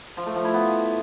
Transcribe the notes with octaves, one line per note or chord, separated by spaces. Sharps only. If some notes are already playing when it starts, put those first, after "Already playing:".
F3
A3
F3
E4
B3